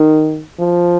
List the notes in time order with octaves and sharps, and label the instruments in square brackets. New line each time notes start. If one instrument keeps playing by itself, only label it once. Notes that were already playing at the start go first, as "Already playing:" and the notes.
Already playing: [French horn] D#3
F3